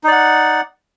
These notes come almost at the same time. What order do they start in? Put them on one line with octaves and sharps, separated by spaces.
D#4 D5 F#5